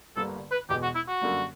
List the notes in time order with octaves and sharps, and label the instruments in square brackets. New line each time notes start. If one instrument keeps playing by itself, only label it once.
[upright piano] G1 G2 D3 G3 A#3 [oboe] A4
[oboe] B4
[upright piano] E2 B2 G#3 [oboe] G4
[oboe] F#4
E4
F#4
[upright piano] F#2 D3 G3 A#3